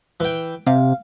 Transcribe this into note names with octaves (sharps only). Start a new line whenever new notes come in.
E3 G5
C3 F5